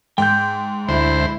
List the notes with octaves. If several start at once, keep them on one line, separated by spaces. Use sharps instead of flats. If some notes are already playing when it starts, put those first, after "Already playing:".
G#2 G5 G6
D2 G#3 E4 C5